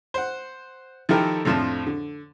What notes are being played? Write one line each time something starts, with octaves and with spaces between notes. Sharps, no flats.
C5 F#5
D#3 F3 E4 G4 A4 A#4
F2 A2 F3 D4 A5
D3